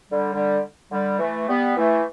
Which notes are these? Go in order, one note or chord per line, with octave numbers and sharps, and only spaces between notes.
D3 G3
D3 G3
D3 G3
E3 A3
G3 B3
E3 A3